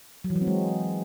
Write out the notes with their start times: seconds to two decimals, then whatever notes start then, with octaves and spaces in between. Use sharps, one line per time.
0.24 F#3
0.30 E3
0.36 F#3
0.41 C4
0.47 G#3